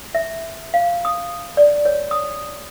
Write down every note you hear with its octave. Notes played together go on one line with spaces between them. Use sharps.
E5
F5
D#6
D5
C#5
D#6